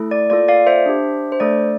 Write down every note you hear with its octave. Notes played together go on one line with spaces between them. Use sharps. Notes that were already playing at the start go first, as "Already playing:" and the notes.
Already playing: A3 E4 A4
D5
A#3 F4 A4 D5
D5 F5
C5 E5
D4 G4
C5
A3 D4 A4 D5